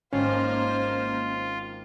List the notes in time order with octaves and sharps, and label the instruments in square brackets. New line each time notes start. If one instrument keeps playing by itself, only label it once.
[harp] G#1 [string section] A#3 C5 [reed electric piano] C#4 [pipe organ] F4